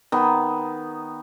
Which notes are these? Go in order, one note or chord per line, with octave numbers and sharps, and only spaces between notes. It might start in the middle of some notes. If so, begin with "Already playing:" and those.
D#3 B3